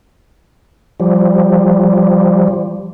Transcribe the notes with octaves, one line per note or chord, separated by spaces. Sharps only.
F3 G3